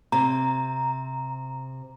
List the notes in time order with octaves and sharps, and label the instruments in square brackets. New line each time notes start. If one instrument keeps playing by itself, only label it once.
[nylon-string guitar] C3 [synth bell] A#5